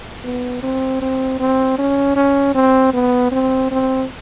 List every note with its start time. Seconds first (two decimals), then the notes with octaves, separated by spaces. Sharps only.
0.24 B3
0.63 C4
1.01 C4
1.40 C4
1.78 C#4
2.16 C#4
2.55 C4
2.93 B3
3.32 C4
3.71 C4